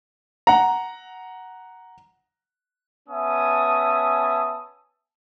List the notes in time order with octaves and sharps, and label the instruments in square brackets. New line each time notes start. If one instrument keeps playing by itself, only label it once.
[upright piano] F#5 A#5
[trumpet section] B3 C#4 E5 G#5 A5 D#6